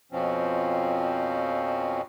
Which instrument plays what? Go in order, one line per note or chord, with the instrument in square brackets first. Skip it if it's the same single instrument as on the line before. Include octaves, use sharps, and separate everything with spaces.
[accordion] F2 B2 F3 C4 C#4